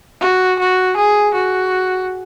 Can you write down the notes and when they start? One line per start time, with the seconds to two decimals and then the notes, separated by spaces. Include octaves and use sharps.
0.21 F#4
0.59 F#4
0.97 G#4
1.34 F#4